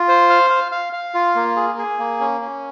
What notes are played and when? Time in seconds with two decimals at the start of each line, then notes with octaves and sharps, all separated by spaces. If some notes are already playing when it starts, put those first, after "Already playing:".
Already playing: F4
0.08 C5
0.30 F5
0.50 F5
0.72 F5
0.93 F5
1.14 F4
1.35 A#3
1.56 G#4
1.78 G#4
1.99 A#3
2.20 C#4
2.41 C#4